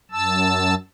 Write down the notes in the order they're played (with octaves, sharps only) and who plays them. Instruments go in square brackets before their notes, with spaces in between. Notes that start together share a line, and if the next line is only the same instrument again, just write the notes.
[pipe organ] F#2 A5 E6